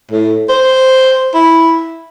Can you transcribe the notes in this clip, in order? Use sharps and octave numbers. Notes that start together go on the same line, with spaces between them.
A2
C5
E4